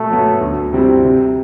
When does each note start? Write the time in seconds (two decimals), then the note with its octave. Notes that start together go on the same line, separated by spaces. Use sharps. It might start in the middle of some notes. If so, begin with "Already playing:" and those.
Already playing: B2 A3
0.10 F#3 B3
0.41 D2
0.73 C3 G3 C4 E4
1.04 C3